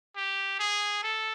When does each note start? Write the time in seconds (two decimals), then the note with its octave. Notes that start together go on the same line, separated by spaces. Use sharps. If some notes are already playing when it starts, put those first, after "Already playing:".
0.16 G4
0.59 G#4
1.03 A4